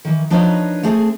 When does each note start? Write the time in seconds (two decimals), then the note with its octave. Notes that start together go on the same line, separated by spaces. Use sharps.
0.05 D#3 E3
0.30 F3 D4 D#4 A#4 B4 C#5
0.83 A3 C4 G#4 A4